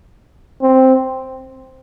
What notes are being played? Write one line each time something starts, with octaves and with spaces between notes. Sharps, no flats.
C4